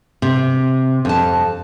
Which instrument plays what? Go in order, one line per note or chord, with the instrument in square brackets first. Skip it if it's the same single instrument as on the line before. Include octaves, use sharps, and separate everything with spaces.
[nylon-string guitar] C3
F2 A5